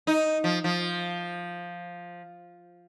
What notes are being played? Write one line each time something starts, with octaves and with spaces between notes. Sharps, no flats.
D#4
F3
F3